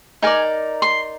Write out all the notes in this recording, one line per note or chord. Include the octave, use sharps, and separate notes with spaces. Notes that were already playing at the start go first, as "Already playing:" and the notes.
D#4 A#4 D5 G#5
C6